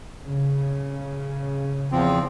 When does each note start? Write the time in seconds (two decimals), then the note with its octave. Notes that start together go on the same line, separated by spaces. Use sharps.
0.22 C#3
1.92 E2 F3 C4